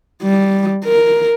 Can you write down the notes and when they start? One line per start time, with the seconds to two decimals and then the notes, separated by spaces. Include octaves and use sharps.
0.23 G3
0.85 A#4